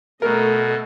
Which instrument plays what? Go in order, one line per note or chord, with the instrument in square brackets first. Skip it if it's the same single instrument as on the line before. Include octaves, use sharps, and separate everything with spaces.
[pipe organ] B2 [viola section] A3 A4 D#5 [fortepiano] A#4